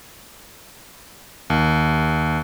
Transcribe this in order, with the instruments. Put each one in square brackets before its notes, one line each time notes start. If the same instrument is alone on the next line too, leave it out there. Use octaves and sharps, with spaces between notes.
[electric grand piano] D#2